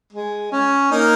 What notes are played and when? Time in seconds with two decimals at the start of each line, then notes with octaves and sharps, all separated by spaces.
0.13 G#3
0.52 C#4
0.91 A#3 D#4